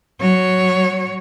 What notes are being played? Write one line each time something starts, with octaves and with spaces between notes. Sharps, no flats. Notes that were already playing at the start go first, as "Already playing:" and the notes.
F#3 C#5